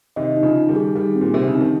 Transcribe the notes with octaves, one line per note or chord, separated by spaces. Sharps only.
C3 D#3 D#5
D#4
C#3 F3
D#4
D#3 G3
G#4
D#3 G3 G#4
C4
A#2
C3 C4
C#3
D#4
D#3